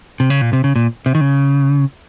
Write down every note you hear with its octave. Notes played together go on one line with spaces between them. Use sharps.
C3
C#3
A#2
C3
C#3
A#2
C3
D#3
C#3